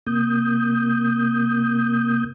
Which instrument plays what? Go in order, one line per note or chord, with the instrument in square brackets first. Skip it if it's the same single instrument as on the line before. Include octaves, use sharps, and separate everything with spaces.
[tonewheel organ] C3 A#3 D#6 G6